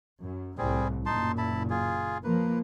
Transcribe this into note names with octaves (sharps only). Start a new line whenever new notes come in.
F#2
C2 A2 G3 C4 G#4
F#1 A#2 D#4 A5 C6
E4 A5 B5
F4 G#4
F3 A#3 B4